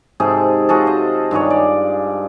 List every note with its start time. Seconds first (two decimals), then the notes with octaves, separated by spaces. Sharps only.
0.20 G#2 C3 G#4 A4
0.69 F4 F#4 G#4 A4
0.86 C5 D#5
1.31 G2 D#3 G#4 C#5
1.50 D5